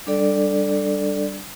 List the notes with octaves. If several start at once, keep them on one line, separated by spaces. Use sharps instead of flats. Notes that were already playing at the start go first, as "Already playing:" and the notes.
G3 D4 A4 D5